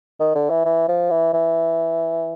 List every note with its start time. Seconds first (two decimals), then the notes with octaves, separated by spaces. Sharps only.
0.20 D#3
0.35 D3
0.50 E3
0.65 E3
0.88 F3
1.10 E3
1.33 E3